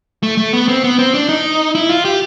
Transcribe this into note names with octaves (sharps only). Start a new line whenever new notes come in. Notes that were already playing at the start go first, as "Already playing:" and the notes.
A3
A3
B3
C4
B3
C4
D4
D#4
E4
F4
G4